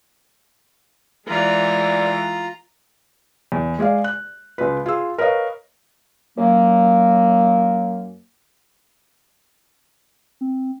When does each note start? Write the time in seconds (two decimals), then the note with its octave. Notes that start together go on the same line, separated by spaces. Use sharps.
1.27 E3 G#3 F4 A#4 D5 A#5
3.52 E2
3.79 G#3 G#4 D5 F5
4.04 F#6
4.58 C#2 F4 B4
4.86 F4 G#4 E6
5.18 A#4 B4 C#5 D#5 F5
6.37 F#2 F#3 A#3
10.41 C4